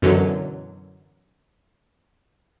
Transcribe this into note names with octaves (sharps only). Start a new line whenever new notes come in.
F#2 B2 D3 E3 F#3